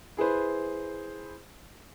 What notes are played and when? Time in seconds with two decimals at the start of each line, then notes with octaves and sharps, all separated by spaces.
0.17 E4 G#4 B4 C5